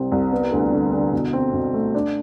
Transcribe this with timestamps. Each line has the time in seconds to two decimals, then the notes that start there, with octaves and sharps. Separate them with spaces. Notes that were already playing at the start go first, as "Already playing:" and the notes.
Already playing: C2 C3 C4
0.12 C2
0.32 B3
0.52 D2
0.72 D3
0.93 D3
1.13 B2
1.33 C4
1.53 B2
1.74 A3
1.95 D4